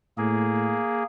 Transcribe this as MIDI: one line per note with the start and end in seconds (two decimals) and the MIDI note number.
0.18 0.77 45
0.18 1.04 58
0.18 1.04 68